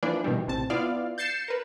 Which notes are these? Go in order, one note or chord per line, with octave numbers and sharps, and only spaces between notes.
E3 F3 A#3 D4 B4 D5
B2 D#3 E3 G3
A1 C3 A5
B3 E4 F4 D5 F5
G6 A6 C7 C#7 E7
A#4 B4